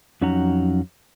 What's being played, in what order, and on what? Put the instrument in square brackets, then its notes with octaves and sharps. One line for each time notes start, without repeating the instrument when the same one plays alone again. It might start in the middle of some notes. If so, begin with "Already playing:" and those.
[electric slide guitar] F2 F#3 C#4 D#4 F#5 A#5